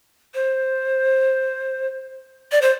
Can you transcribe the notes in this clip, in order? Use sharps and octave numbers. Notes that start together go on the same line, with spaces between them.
C5
D5
C5